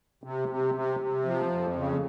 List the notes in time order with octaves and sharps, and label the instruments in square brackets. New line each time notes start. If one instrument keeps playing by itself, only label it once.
[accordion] C3
C3
C3
C3
F3
F2
C#3